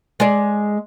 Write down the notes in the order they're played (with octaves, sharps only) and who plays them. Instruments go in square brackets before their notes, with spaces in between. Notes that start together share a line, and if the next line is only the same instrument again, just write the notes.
[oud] G#3 D5